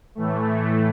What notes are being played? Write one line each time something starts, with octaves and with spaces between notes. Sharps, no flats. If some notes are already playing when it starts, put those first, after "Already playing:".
A2 E3 A3